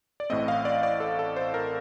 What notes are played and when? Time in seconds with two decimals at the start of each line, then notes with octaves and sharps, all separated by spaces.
0.20 D5
0.30 A1 A2 A3 C4 D#5
0.48 F5
0.65 D5
0.83 D5
1.00 A4
1.19 A4
1.36 C5
1.54 A#4